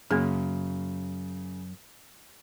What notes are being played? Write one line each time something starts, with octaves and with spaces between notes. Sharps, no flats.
F#2 C#3 A#3 G#4